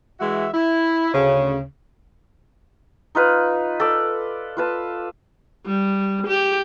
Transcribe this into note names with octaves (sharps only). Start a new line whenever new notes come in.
E3 G#3 F#4 E5
E4
D2 C#3
D#4 F4 B4
A4 D5
F4 B4 A5
G3
G4